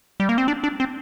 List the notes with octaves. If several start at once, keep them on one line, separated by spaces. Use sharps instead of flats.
G3
A#3
C4
D4
D4
C4